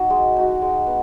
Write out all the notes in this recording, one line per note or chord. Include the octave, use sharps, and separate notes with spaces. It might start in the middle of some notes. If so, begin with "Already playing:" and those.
Already playing: D#4 F#4
G#3
D#4 F#4
G#3
B3